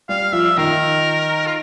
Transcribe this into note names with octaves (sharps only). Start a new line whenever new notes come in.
G3 F5
F3 E5
D#3 A#4
F4